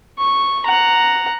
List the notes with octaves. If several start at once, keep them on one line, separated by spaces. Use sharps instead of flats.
C#6
F#5 A#5